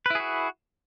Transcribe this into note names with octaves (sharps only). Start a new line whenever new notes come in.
E4 F#4 G#4 B4